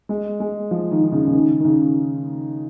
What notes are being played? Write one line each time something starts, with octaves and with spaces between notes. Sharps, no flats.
G#3
G#3
F3
D#3
D#3
C#3
C#3
D#3
D#3
C#3